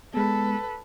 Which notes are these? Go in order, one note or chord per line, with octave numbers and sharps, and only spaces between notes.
G#3 B3 A4 B4